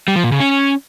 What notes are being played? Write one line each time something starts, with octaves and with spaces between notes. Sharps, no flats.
G3
F3
A#2
C#3
C#4